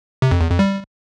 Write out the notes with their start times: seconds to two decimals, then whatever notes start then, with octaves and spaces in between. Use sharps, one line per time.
0.22 C3
0.31 F2
0.41 E2
0.50 F2
0.59 G3